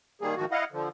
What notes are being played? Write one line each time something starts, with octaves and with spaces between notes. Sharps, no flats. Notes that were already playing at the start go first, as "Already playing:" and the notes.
D#3 G3 A#3 G#4
G#2 D#3 F3 F#4
E4 D#5 F5 F#5
D3 F3